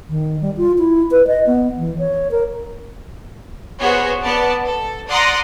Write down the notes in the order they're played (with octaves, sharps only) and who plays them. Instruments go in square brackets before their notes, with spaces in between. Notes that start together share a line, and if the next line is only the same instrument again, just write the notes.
[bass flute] D#3
G3
F4
E4
B4
D#5
B3
E3
C#5
A#4
[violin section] B3 F#4 G#4 C5 C#5
B3 D5 A5
A4
D5 F#5 A#5 C6 D6 D#6